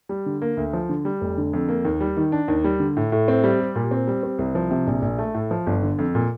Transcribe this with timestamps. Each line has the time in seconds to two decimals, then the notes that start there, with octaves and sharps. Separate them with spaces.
0.09 G3
0.26 D3
0.42 A#3
0.57 D2
0.73 F3
0.89 D3
1.05 G3
1.21 F1
1.37 D3
1.53 F2
1.68 A#3
1.85 D#2
2.01 G3
2.17 D#3
2.32 D4
2.48 D#2
2.64 G3
2.80 D3
2.97 A2
3.12 A2
3.28 C4
3.44 G3
3.60 G4
3.75 A#2
3.91 C4
4.07 G3
4.23 C4
4.39 C2
4.55 F3
4.71 C3
4.87 A#1
5.02 A#1
5.18 A3
5.34 A2
5.51 F3
5.67 G1
5.83 D3
5.98 F2
6.15 A#2